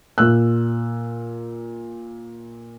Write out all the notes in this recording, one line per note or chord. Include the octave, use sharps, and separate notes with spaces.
A#2 E6 F#6